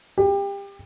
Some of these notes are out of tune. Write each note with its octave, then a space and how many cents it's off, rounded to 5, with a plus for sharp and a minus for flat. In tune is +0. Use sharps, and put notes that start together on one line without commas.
G4 +25